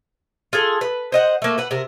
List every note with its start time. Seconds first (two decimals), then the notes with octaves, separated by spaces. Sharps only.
0.53 F4 G#4 A4
0.81 B4
1.12 C5 D#5 F#5
1.42 A3 A#3
1.58 B4 F#5
1.71 C3 A#4